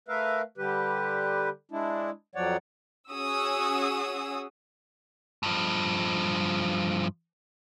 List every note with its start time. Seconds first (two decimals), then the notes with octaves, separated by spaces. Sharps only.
0.08 A3 A#4 B4 E5 F5
0.58 D3 G3 G4 B4
1.72 G#3 D4 E4
2.35 F2 F3 F#3 C#5 D5 F#5
3.10 C#4 F#4 G#4 D#6 E6
5.43 G2 F3